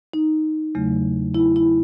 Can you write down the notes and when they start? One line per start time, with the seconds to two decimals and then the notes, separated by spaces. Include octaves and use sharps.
0.14 D#4
0.75 E2 C#3 F#3 A3
1.34 E4
1.56 E4